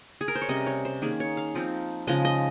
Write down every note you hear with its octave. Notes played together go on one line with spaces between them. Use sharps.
G#4
A#4
C5
C#5
C3 G3 C#4 D#5
C#5
C5
D#3 A#3 C#4 G#4
C#5
F5
F3 C4 D#4
C#3 F3 G#3 D#5
D#5